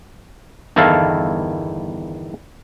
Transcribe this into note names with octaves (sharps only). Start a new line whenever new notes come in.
G1 E2 D#3 E4 A4 F5